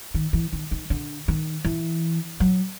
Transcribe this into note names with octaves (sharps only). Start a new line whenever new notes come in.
D#3
E3
D#3
D#3
D3
D#3
E3
F#3